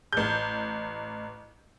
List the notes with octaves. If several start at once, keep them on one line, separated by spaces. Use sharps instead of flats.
A1 G6